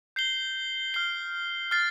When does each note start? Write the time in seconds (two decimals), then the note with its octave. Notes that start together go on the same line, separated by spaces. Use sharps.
0.16 G6 C7 G7
0.94 F6 C7 G7
1.71 F6 A6 C7